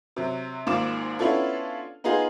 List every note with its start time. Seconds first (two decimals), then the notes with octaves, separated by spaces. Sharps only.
0.16 C3 F#3
0.67 G#1 G#2 A#3 F4 D6 E7
1.19 B3 C#4 D4 E4 F4 A4
2.04 B3 D#4 F4 G#4